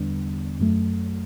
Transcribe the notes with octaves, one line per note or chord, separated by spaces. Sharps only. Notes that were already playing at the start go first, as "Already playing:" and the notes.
Already playing: E2 D3 G3 B3 D4
F#2 F#3 A3